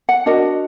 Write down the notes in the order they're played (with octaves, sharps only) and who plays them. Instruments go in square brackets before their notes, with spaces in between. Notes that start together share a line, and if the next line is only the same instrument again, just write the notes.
[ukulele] F#5
D4 F#4 A#4 D#5